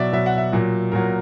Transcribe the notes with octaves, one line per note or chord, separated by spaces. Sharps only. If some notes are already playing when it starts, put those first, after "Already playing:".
Already playing: B2 F#3 D5 E5
B2 F#3 E5
F#5
E5
A#2 F#3
A#2 F#3 A#4